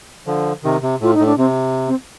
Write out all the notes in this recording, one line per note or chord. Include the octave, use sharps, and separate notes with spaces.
D3 F3
C3 D#3
C3
A2 F4
D#4
A2
D4
C3 C4
C4